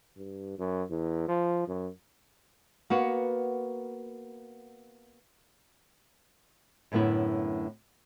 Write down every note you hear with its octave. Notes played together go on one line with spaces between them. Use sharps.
G2
F#2
E2
F3
F#2
A#3 B3 F#4
F#2 A2 D3 B3 E4